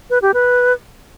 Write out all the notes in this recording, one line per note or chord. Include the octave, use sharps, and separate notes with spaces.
B4
G4
B4